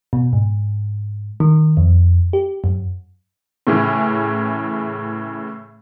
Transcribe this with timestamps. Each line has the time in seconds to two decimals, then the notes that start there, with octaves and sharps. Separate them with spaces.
0.13 B2
0.33 G#2
1.40 D#3
1.77 F2
2.33 G4
2.64 F#2
3.67 A2 C#3 E3